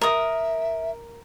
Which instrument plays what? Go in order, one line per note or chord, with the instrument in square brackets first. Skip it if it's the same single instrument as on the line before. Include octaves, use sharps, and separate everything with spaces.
[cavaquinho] A#4 D#6 [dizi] E5